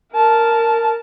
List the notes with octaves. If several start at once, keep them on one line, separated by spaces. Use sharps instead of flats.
A#4 A5